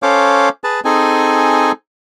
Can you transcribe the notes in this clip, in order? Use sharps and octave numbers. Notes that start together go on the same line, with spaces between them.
C#4 A4 C5 C#5 F5 D6
G#4 B4 A5
C4 D#4 G#4 A4 G#5